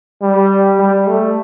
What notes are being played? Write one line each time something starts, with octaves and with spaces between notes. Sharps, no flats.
G3
G3
A3